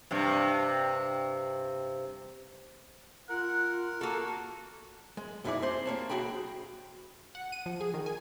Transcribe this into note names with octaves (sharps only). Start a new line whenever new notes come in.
G2 C3
F4 A#4 F#5
A#3 F#4 A4
G#3
B1 F2 D#4 E4 G#4 D5
C4 G#4 C5
G3 A#3 C#5 A5
B1 F3 F#4 G#4 G5 B5
F#5
D#7
F3
G#4
D#3
G#5